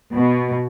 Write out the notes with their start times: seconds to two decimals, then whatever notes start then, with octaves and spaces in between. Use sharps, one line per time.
0.14 B2